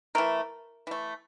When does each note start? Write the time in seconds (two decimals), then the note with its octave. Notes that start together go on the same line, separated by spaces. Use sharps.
0.15 E3 A3 A#4
0.87 E3 A3